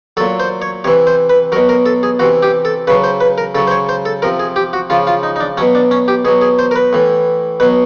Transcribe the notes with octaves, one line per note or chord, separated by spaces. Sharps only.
A#2 F#3 A4
C5
C#5
C3 E3 C#5
C5
B4
B2 F#3 A#4
A#4
A4
G#4
C3 E3 F#4
G4
A4
C#3 F#3 B4
C5
B4
A#4
C#3 F#3 A4
C5
C#5
C5
A4
C3 F3 A#4
G#4
G4
F#4
C#3 F3 F4
F4
D#4
D#4
D4
B2 F#3 C#4
D4
C#4
G4
B2 F#3 G#4
G#4
C5
A#4
B4
A2 E3
B2 F#3 B4